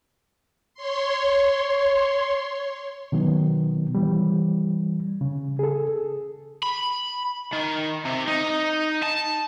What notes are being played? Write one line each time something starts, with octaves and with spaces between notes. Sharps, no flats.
C#5 C6
B2 D#3 F#3 B3
E3 G3
C#3
G#4 A4
B5
D#3
C3
D#4
A5